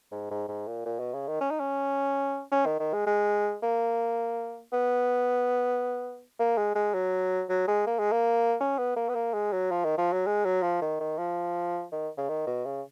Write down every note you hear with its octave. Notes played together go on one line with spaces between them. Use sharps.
G#2
G#2
G#2
A#2
A#2
B2
C#3
D#3
C#4
D#4
C#4
C#4
D#3
D#3
G#3
G#3
A#3
B3
A#3
G#3
G#3
F#3
F#3
G#3
A#3
G#3
A#3
C#4
B3
A#3
B3
A#3
G#3
F#3
F3
D#3
F3
F#3
G#3
F#3
F3
D#3
D#3
F3
D#3
C#3
D#3
B2
C#3